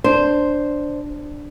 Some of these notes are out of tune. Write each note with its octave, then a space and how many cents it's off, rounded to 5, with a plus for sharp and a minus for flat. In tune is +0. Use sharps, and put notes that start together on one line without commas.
D4 +0 C5 +0